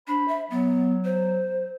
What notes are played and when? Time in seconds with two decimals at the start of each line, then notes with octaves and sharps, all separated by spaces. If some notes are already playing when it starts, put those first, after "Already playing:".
0.08 D4 C5 B5
0.28 E5
0.50 F#3 B3
1.05 C5